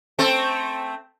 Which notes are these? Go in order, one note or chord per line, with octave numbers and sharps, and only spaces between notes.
A3 C4 A4